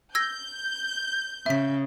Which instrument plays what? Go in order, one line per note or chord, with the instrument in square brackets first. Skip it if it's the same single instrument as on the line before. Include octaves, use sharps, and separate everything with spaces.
[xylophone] E6 G#6 A#6 [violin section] G6
[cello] C#3 [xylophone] E5 B6